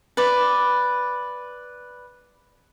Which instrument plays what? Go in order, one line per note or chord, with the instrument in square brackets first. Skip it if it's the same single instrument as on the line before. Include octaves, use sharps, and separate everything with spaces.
[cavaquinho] B4 D5